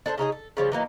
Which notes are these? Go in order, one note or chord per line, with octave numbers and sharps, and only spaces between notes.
D4 A4 A#4 C5
C#3 D#4 F4 G#4
A4
C#3 F3 G3 C#5
E3 F#3 A#3 D#4